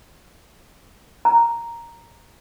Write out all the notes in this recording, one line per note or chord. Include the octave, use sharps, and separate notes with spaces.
A#5